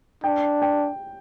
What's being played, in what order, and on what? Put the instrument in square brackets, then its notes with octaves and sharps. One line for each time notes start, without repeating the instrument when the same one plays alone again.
[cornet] D4 [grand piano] G5
[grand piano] G5